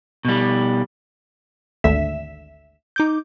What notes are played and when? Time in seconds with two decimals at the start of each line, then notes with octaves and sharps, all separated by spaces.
0.25 B2 G3
1.84 G#1 D2 D3 E5 B6 E7
2.96 D#4 D6 G6